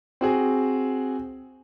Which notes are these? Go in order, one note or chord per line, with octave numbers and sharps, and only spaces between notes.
C4 F#4 G#4